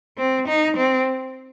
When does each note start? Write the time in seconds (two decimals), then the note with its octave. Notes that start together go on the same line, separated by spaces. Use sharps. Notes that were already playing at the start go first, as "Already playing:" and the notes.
0.18 C4
0.47 D#4
0.76 C4